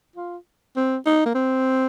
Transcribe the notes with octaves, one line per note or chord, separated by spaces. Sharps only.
F4
C4
D#4
A#3
C4